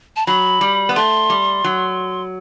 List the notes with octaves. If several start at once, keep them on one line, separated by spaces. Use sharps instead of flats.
A5
F#3 B5
G3
B3
A3 C6
G3
F#3